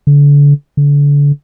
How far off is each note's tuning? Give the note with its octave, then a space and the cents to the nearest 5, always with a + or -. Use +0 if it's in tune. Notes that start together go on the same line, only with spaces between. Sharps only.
D3 -35
D3 -35